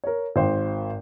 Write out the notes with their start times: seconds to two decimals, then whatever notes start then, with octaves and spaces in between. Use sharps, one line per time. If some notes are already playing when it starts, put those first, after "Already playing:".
0.04 A#4 C#5
0.36 G#1 C5 G5